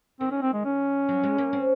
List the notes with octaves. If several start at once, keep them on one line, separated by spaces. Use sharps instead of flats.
D#3 C4
C#4
C4
G#3
C#4
F#3
G#3
A#3
C4